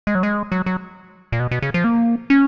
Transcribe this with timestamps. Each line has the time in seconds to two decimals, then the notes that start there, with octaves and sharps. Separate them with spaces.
0.07 G#3
0.15 F#3
0.23 G#3
0.52 F#3
0.66 F#3
1.32 A#2
1.40 B2
1.51 B2
1.62 C#3
1.74 F3
1.84 A#3
2.30 C#4